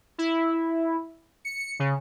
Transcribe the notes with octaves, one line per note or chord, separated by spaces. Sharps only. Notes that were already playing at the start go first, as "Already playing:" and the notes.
E4
C#7
C#3